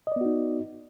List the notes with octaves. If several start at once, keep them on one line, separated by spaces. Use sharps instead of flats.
B3 D#4 F#4 D5 D#5